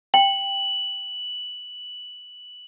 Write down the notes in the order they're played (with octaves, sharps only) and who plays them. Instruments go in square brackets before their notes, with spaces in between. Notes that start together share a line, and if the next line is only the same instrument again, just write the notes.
[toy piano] G5 [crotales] F#7